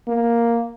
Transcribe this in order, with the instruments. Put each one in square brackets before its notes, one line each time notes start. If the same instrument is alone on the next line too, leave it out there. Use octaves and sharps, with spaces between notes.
[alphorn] A#3